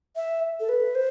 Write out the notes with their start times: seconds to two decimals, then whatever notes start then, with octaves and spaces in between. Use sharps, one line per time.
0.16 E5
0.60 A4
0.69 B4
0.95 C5